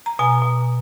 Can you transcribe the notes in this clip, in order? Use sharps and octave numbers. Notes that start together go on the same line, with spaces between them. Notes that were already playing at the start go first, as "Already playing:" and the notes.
A#5
B2 G#5
B2